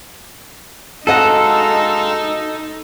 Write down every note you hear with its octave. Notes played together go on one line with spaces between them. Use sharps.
G#3 D#4 F#4 A4 D#5 F5 F#5 A#5